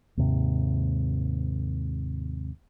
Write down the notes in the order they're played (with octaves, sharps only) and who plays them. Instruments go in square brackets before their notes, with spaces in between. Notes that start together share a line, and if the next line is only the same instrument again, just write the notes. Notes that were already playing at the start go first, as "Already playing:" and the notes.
[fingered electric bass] D#2 G#2 C3